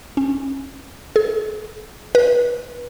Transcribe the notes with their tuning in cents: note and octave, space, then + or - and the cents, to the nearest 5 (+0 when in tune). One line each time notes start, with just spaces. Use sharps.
C#4 -30
G#4 +40
B4 -30